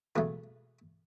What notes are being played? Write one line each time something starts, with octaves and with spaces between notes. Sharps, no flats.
C#2 B2 F#3 A3 B4